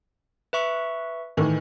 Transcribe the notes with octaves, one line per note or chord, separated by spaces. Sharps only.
B4 E5 C#6
A2 D#3 E3